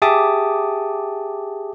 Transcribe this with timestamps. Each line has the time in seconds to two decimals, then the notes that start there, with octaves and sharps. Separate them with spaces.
0.02 G4 G#4 E5 A5 D6 D#6